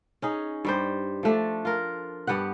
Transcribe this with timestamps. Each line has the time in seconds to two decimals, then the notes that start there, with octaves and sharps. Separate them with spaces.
0.22 C#4 D#4 G#4
0.65 G2 G3 C5
1.23 F3 A3 D4
1.65 F4 A#4
2.27 G2 B3 G4 F#5